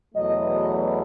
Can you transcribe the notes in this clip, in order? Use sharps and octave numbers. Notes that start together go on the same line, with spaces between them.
E2 B2 F#3 A3 D#5